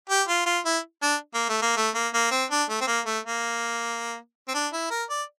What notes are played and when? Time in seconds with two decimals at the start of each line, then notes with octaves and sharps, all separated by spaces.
0.09 G4
0.28 F4
0.46 F4
0.65 E4
1.02 D4
1.34 A#3
1.49 A3
1.62 A#3
1.77 A3
1.95 A#3
2.14 A#3
2.31 C4
2.50 D4
2.69 A3
2.81 C4
2.87 A#3
3.06 A3
3.25 A#3
4.48 C4
4.54 D4
4.73 E4
4.91 A#4
5.10 D5